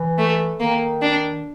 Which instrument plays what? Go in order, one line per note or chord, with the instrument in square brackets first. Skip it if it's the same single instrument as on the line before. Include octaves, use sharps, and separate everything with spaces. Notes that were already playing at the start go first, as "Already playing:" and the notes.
Already playing: [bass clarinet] E3
[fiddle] A3
[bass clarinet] D#3 [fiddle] A#3
[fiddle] D4